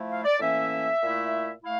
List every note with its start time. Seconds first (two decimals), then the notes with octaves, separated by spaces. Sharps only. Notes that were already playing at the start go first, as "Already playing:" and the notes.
Already playing: F3 A3 E4
0.09 F5
0.24 D5
0.40 A2 E3 A#3 C#4 E5
1.02 A#2 A3 E4
1.64 A3 E4 F5